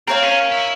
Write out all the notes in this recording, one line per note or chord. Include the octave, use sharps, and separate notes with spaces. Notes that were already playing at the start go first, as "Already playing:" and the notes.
C4 A#4 C#5 F5
C#4
E4